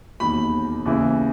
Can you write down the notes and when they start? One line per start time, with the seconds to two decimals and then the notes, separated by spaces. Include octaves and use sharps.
0.20 E1 D#2 D#3 B5
0.85 D#2 C#3 E3